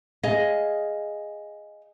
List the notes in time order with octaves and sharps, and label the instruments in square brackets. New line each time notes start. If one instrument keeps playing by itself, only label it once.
[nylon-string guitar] G#4 D#5 F5